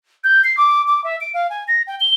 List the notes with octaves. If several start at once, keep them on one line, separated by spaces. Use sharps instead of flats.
G6
C7
D6
D6
E5
D7
F5
G#5
A#6
G5
G7